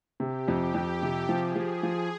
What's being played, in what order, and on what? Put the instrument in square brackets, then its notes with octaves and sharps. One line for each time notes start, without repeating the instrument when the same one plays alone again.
[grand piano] C3 [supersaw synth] G4
[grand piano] F2
F2
C3
[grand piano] F3 [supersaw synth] G#4
[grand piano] F3
F3